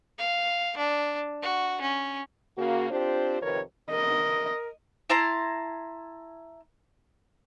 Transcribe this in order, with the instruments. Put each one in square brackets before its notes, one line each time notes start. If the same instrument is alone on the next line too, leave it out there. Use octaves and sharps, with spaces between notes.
[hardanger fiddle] F5
D4
F#4
C#4
[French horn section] C#3 A#3 F#4
C4 D4 F4 G4 C5
F2 C3 D#3 A#4 B4 C#5
[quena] A#4 [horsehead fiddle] D#5
[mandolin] E4 A5 A#5 C6